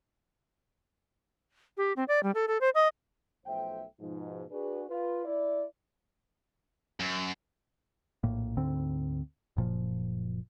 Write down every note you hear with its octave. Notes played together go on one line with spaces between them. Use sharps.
G4
C4
D5
G3
A4
A4
C5
D#5
B1 F3 A3 C5 E5 G5
G#2 B2 F3 D#4
D4 F#4 G#4 B4
F4 B4
E4 D5
F#2
A#1 A2 A#3
D2 G#2 D3 C4
F#1 A#2 F3